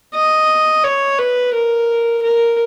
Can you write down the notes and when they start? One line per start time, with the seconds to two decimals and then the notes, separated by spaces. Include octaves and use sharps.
0.15 D#5
0.84 C#5
1.19 B4
1.54 A#4
2.23 A#4